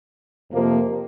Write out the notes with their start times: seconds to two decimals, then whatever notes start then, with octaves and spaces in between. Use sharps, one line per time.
0.51 F2 C3 F3 A#3